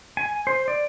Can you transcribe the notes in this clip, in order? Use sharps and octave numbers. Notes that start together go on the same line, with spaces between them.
G#5
C5
D5